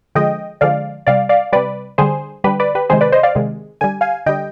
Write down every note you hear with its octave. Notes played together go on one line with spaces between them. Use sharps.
D3 F3 G#3 D#5 G5
D3 F3 G#3 D5 F5
C3 G3 D5 F5
D5 F5
C3 G3 B4 D5
D3 G3 G#4 C5
D3 G3 G4 B4
B4 D5
G4 B4
C3 D#3 G#3 G#4 C5
B4 D5
C5 D#5
D5 F5
C3 D#3 G#3
D3 G3 G#5
F5 G#5
D3 G3 D#5 G5